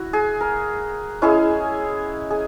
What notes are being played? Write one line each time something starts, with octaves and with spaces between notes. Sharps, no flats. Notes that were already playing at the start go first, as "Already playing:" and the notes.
Already playing: E4 F#4
G#4
A#4
G#3 C#4 E4 G#4
G#4